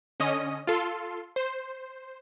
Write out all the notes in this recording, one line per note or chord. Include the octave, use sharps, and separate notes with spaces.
D3 C#4 D#5 D#6
F4 A4 C6
C5